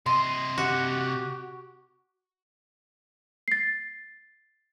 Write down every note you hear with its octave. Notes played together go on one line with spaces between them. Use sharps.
C3 D#5 C6
F#4 G4
A6 C7